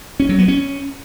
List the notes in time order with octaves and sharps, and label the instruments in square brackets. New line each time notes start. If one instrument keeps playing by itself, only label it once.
[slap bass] C#4
F#3
B3
C#4